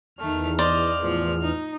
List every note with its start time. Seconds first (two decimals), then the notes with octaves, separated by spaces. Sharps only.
0.18 E2 D#3 A3 F6
0.59 C5 D5 D#5
1.02 A2 F3
1.41 D#4